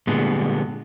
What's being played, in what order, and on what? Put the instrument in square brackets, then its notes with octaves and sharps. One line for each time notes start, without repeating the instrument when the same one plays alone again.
[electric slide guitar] A#2 D3 G3 G#3 B3